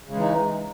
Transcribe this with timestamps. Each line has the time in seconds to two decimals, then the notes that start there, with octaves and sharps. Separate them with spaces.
0.05 C#3
0.10 G#3
0.15 E3
0.19 D#4